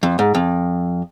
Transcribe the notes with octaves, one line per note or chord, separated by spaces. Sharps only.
F2
G#2
F2